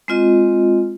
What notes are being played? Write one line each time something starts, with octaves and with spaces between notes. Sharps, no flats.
G#3 C4 F4 D#5